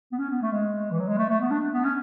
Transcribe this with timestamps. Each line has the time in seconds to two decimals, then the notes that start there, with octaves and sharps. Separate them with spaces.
0.12 B3
0.18 C#4
0.30 B3
0.42 A3
0.52 G#3
0.91 E3
1.00 F#3
1.08 G#3
1.18 A3
1.30 A3
1.41 B3
1.51 D4
1.74 B3
1.84 C#4